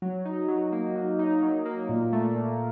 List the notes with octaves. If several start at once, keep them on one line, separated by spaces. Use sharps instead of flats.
F#3
D#4
F#3
A#3
F#3
D#4
F#3
A#3
A#2
A3
A#2